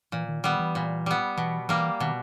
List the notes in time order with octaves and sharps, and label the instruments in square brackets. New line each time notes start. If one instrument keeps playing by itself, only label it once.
[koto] A#2 [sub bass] E3
[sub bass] D#3
[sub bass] D#3 [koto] G3 B3
[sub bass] E3
[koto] A#2
G3 B3
[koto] B2 [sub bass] E3
[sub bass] E3 [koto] G3 A#3
[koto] B2 [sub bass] D#3